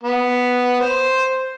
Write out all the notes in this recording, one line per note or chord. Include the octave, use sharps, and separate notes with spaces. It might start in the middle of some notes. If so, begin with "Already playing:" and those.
B3
C5